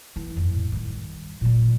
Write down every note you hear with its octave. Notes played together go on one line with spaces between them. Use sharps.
E3
F2
A2
D#3 G3
A#2 G3